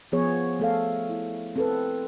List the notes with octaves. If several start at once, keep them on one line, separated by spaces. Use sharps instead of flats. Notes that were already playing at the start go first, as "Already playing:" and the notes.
F3 B3 G#4 C#5
A3 A4 F5
E4
C4 A4 B4